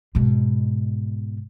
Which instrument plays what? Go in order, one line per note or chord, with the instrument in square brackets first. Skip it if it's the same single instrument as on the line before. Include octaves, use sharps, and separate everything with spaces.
[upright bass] G#2 B2